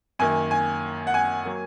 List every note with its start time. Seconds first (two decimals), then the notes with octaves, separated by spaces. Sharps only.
0.19 F#2 D#3 A#3 G#5
0.51 G#5
1.07 F#5
1.14 G#5
1.45 F#3 A#3